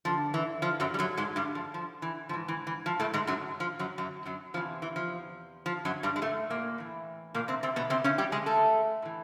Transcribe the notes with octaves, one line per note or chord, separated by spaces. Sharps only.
G2 D3 F3
E3
F3
F#2 F#3
G3
F#2 F#3
G#2 G#3
G2 G3
F3
F3
E3
G#2 E3 F3
E3
E3
F3
A2 A3
G#2 G#3
F#2 F#3
F3
F#2 F#3
F#2 F#3
F#2 F#3
E2 C3 E3 F3
E3
F3
F3
F#2 F#3
G2 G3
G#3
A2 A3
A#2 A#3
A2 E3
A#2 A#3
C3 C4
C3 C4
B2 B3
C3 C4
C#3 C#4
G3 G4
G#3 G#4
A3 A4
A2 E3